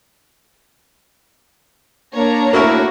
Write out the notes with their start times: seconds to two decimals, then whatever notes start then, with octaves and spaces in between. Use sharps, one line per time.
2.15 A#3 D4 C#5 A#5
2.53 A2 A#3 E4 F#4 A#4